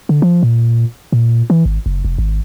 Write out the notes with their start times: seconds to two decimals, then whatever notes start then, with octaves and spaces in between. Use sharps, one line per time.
0.09 D3
0.22 F3
0.43 A#2
1.12 A#2
1.50 E3
1.65 G#1
1.86 F#1
2.05 F1
2.18 G#1